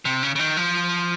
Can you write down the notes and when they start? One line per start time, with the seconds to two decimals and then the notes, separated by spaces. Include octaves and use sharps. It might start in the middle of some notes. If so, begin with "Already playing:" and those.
0.05 C3
0.23 C#3
0.35 C#3
0.39 D#3
0.57 F3